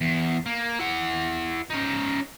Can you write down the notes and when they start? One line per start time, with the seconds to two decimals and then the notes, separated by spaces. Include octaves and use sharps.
0.01 E2
0.46 A#3
0.79 E4 F#5
1.70 C#4 D#4